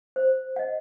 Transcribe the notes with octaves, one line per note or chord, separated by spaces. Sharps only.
C5
D#5 F#5